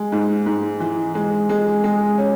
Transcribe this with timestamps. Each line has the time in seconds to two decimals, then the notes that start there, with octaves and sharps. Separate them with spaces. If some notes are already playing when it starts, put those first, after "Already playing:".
Already playing: G#3
0.12 G#2
0.46 G#2
0.80 E3
1.15 G#3
1.49 G#3
1.84 G#3
2.18 C#4